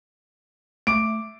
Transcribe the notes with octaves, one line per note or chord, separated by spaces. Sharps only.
A3 D6 D7